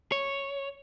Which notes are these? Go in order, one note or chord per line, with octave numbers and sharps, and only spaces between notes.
C#5